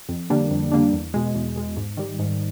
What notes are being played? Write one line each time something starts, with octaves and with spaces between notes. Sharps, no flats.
F2
D3 G3 A#3 D4
F2
D3 G3 A#3 D4
E2
B2 G#3
E2
B2 G#3
G#2
D#3 G3
G#2